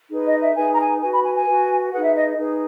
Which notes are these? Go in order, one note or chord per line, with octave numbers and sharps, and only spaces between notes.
D#4 G#4 B4
D#5
E5
D#4 G#4 B4 G#5
A#5
G#5
F#4 B4 G#5
B5
G#5
G#5
F#4 B4
D#4 G#4 B4 F#5
E5
D#5
D#4 G#4 B4